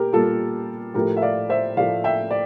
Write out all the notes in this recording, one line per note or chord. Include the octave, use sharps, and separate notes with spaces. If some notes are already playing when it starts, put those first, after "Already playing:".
Already playing: A#2 G4 A#4
A#2 G3 F4 A4
A2 F3 A3 G4 A#4
E5
D5 F5
C5 E5
A2 F3 A3 D5 F5
E5 G5
D5